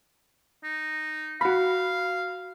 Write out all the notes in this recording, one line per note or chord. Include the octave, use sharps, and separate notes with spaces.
D#4
F#4 F5 B5